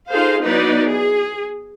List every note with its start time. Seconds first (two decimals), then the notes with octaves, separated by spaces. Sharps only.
0.10 D#4 F4 G#4 A4 C5 F5
0.43 F#3 B3 D#4 E4 B4 D5
0.88 G#4